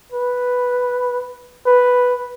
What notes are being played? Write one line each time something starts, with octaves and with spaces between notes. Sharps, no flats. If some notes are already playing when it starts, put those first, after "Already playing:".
B4
B4